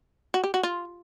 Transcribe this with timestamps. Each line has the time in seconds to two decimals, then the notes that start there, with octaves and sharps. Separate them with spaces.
0.34 F#4
0.44 G4
0.54 F#4
0.63 F4